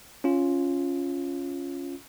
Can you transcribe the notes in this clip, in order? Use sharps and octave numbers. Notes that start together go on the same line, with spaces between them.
C#4 F4